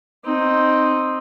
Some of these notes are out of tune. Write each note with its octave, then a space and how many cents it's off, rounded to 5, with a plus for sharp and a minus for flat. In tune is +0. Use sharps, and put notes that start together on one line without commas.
C4 +0 D#4 -10